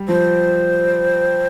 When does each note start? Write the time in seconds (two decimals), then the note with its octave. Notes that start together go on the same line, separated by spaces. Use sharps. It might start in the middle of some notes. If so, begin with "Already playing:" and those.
Already playing: G3
0.08 F3 C5